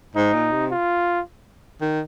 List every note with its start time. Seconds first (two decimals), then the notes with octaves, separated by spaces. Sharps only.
0.16 G#2 D#4
0.34 A#2
0.52 C3
0.71 F4
1.81 D#3